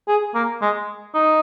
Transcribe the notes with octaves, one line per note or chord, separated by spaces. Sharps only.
G#4
A#3
G#3
D#4